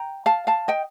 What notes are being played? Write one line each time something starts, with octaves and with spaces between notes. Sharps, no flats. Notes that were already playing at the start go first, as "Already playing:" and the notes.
Already playing: G5 A#5
F5 A5
F5 A5
D#5 G5